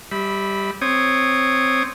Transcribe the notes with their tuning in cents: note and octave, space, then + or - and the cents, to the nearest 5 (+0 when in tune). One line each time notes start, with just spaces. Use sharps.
G3 +0 E5 -35 B5 +0
C4 +0 C#5 +0 D#6 -20